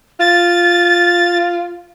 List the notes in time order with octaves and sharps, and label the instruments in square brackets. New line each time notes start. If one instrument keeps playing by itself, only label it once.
[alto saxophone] F4 [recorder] A6